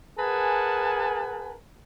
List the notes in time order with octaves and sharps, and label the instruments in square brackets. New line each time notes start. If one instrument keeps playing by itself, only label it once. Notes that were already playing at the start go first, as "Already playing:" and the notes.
[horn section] G#4 A#4 B4 F#5 G#5 A5